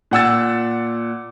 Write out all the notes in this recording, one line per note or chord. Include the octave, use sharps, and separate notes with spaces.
A#2 F#5 E6 A6